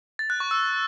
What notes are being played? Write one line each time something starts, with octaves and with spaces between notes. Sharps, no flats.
A6
F#6
C#6
E6